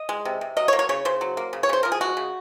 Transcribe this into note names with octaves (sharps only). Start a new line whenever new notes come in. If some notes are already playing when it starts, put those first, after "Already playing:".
Already playing: D#5
G#3
C3
C3
F#3 D#5
C#5
A#3
C#5
C#3 C#5
C#3 C5
F#3
A#3
C#3
C#5
C#3 C5
F3 A#4
G#4
G#3 F#4
C#3